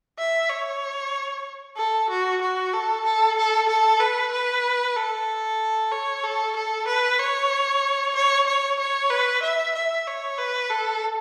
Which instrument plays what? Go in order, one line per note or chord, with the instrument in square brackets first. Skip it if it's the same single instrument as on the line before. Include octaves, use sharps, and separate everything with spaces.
[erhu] E5
C#5
A4
F#4
F#4
A4
A4
A4
A4
B4
B4
A4
C#5
A4
A4
B4
C#5
C#5
C#5
C#5
B4
E5
E5
C#5
B4
A4